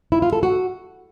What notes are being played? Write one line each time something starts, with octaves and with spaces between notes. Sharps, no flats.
E4
F4
A4
F#4